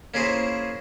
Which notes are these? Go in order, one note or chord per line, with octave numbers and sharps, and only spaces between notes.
A#3 C#4 E4 G#4 A#4 C5